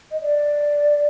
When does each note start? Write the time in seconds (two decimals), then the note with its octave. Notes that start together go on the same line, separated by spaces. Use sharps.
0.11 D#5
0.22 D5